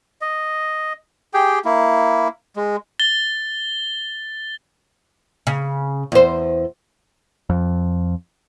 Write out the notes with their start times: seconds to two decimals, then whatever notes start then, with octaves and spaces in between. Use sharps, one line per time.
0.21 D#5
1.34 G4 G#4 G5
1.65 A#3 E4
2.56 G#3
2.99 A6 G7
5.47 C#3
6.12 E2 C5
7.50 F2